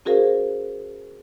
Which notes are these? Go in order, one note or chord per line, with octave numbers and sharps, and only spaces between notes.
C#4 F#4 G#4 A#4 C5 F5